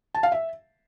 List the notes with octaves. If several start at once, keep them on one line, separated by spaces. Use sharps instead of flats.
A5
F5
E5